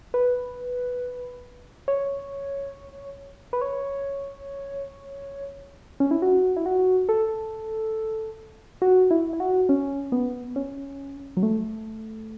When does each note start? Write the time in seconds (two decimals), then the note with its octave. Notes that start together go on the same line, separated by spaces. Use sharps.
0.14 B4
1.88 C#5
3.53 B4
3.61 C#5
6.00 C#4
6.11 E4
6.22 F#4
6.57 E4
6.66 F#4
7.09 A4
8.82 F#4
9.11 E4
9.33 E4
9.40 F#4
9.69 C#4
10.12 B3
10.56 C#4
11.37 F#3
11.43 A3